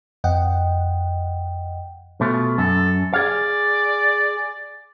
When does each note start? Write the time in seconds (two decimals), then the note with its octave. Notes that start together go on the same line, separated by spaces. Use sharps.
0.24 F2 D#5 F#5 G5
2.21 B2 A3 F4
2.58 F#2 A4
3.13 G#4 D5 F5